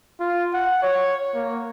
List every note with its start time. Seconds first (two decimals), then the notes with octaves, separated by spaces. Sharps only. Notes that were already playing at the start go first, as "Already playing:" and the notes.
0.20 F4
0.54 F#5
0.83 C#5
1.34 A#3